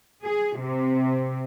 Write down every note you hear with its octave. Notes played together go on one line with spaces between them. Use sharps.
G#4
C3